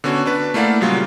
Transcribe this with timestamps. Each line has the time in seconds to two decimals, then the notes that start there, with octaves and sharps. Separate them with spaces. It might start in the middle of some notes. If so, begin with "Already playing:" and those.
0.04 D3 B3 C#4 F#4
0.26 D4 B4
0.54 A3 A#3 E4 D5 F5 F#5
0.81 A#2 C#3 F#3 G3 F4